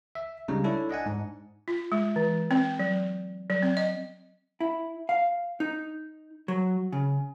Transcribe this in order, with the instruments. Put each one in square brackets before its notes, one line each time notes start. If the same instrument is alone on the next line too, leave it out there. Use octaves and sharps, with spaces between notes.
[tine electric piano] E5
C#3 G3 G#3 D4 D#4
D4 E4 A4 C#5
D4 D#5 F#5 G#5
G#2
[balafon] F4
G#3
E3
C4
F#3
F#3
C4
D#5
[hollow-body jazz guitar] E4
F5
D#4
F#3
C#3